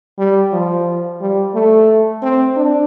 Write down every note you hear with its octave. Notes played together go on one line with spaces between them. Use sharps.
G3
F3
G3
A3
C4
D4